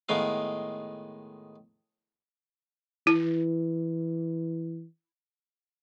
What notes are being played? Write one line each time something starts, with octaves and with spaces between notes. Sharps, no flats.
A2 D#3 G#3 B3 F5
E3 E4